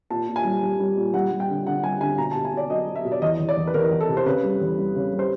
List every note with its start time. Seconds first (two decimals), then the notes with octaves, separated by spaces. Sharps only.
0.10 A#2 A5
0.28 A#2
0.36 G#5
0.45 G3
0.63 G3
0.80 G3
0.97 A#2
1.14 G3 F#5
1.31 G3
1.40 G5
1.49 D3
1.66 D3 F#5
1.84 G3 G#5
2.01 D3 G#5
2.18 B2 A#5
2.31 A5
2.36 B2
2.45 G#5
2.53 B2 D5
2.70 F#3 D#5
2.88 F#3
2.96 E5
3.05 B2
3.12 D5
3.22 E2 D#5
3.40 E2
3.49 D5
3.57 E2
3.67 B4
3.74 E2 A#4
3.91 E2
4.01 A4
4.09 C3
4.17 C5
4.26 C#3 B4
4.43 G3
4.61 E2
4.79 G3
4.96 C#3
5.13 G3
5.19 C5